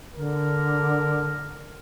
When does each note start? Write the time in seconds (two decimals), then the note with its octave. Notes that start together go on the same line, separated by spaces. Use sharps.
0.16 D3 A#4